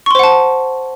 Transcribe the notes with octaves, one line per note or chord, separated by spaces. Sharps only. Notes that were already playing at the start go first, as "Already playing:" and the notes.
C5 F#5 A5 C6 C#6